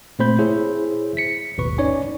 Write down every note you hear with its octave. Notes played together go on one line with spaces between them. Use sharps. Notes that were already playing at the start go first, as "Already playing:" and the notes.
A#2 A3 C4 C5 B5 G6
E4 G#4 C5 C#5 E5
B6 C#7
G#1 D#2 B2 B4 C#6
C#4 D#4 C#5 D5 G#5